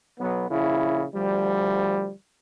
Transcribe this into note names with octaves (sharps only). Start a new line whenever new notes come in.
B1 F#3 B3
A#1 C#3 E4
D2 F3 G3